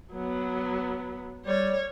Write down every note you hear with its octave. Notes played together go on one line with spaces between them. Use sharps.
F#3 B3
G3 C#5